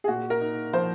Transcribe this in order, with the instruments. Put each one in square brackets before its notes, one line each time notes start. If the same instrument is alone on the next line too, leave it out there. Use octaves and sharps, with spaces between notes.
[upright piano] G#4
[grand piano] A#2 [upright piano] F#4
[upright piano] A#4
[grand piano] D#4
[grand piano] F3 [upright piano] C5